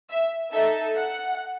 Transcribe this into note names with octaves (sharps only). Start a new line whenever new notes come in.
E5
D#4 A4 E5
F#5